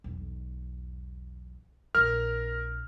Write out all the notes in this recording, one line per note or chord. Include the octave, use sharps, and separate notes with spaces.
B1 E2
A#1 C4 A#4 F6